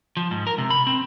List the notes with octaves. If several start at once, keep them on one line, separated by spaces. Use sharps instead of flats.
F3
G#2
A#4
C3
B5
C4